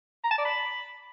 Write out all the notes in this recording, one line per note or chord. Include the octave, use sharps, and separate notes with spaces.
A#5
A5
D5
B5